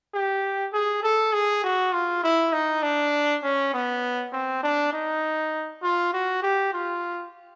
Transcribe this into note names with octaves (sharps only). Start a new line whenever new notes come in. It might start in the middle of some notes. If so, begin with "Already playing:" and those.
G4
G#4
A4
G#4
F#4
F4
E4
D#4
D4
C#4
B3
C4
D4
D#4
F4
F#4
G4
F4